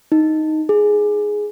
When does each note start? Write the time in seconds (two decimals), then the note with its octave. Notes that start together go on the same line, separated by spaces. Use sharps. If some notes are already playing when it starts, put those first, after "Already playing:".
0.12 D#4
0.69 G#4